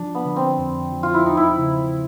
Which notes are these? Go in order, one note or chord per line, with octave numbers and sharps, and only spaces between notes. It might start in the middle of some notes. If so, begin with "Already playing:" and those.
Already playing: F3 D4
B3
D3
C4
F2
F3
F4
E4
E2 D#4
E4
C#3